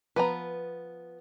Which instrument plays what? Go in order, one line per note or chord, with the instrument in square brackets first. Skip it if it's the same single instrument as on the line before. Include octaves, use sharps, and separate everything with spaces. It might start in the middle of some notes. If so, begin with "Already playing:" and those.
[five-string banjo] F3 B3 A#5 [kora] B4